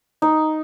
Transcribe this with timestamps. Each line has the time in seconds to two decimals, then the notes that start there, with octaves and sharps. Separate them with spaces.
0.22 D#4